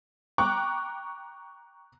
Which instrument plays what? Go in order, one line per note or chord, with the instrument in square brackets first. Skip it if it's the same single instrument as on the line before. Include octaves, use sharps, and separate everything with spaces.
[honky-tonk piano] G5 A#5 C#6 D6 F#6